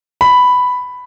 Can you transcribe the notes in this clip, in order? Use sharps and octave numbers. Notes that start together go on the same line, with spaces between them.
B5